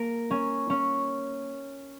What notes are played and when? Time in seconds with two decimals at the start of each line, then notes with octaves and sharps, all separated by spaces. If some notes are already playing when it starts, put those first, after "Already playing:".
Already playing: A#3 A#4
0.31 C#4
0.70 C#4